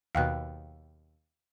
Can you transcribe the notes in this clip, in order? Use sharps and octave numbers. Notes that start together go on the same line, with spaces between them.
D#2 B2 F5 G5 F#6